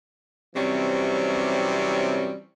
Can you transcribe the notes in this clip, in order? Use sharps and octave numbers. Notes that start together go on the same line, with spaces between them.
C3 E3 F#3 G3 C4 C#4